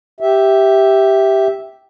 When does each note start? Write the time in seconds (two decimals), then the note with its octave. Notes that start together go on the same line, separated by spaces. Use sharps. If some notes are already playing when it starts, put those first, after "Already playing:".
0.20 G4 E5